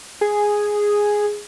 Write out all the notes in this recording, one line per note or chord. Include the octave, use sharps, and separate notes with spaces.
G#4